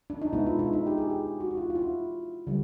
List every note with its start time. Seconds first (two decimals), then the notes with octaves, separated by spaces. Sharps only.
0.10 D4
0.22 D#4
0.33 B2 G#3 B3 E4
0.47 F4
0.59 E4
0.73 D#4
0.86 G4
0.98 G#4
1.10 G4
1.40 F#4
1.51 F#4
1.57 F4
1.70 F4
1.75 E4
2.47 D3 G3